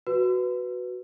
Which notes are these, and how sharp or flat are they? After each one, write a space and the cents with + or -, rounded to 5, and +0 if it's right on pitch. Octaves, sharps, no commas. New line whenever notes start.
F#4 +0 B4 +0